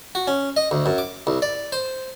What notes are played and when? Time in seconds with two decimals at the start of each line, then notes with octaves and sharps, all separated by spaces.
0.15 F#4
0.27 C#4
0.57 D#5
0.71 D2
0.86 F#2
0.98 D6
1.27 C2
1.42 D5
1.72 C5